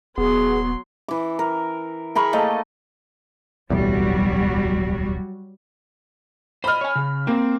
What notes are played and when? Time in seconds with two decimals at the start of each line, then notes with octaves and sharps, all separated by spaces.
0.18 D#1 F#3 B3 G#4 C6
1.08 E3 D6
1.39 A#4
2.15 G#4 A#4 B5 C#6
2.33 A3 A#3 A4 D#5
3.70 D1 B1 E2 F#3 G3 F#4
6.64 C5 D#5 B5 F6
6.81 C#5 G#5
6.96 C#3
7.27 A#3 C4